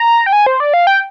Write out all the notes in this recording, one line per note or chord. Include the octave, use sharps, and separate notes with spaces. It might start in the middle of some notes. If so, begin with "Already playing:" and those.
Already playing: A#5
G5
G#5
C5
D5
F5
G5